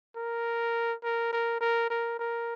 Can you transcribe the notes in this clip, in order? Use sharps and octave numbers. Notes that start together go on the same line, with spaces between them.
A#4
A#4
A#4
A#4
A#4
A#4